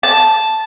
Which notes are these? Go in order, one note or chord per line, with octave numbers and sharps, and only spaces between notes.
A5